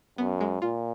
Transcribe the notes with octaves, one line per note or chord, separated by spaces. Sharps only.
F#2 B3
G#3
A#2 F4